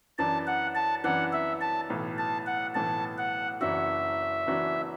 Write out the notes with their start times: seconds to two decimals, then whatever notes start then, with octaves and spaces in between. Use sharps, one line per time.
0.19 F#2 E3 D4 A5
0.47 F#5
0.75 A5
1.04 F#2 E3 D4 F#5
1.33 E5
1.61 A5
1.90 B1 A2 E3
2.18 A5
2.47 F#5
2.75 B1 A2 E3 A5
3.18 F#5
3.61 F#1 F#2 E3 D4 F#4 E5
4.46 F#1 F#2 E3 D4 F#4